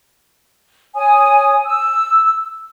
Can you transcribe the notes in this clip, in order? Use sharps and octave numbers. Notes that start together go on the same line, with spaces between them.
C#5 G#5 D#6
E6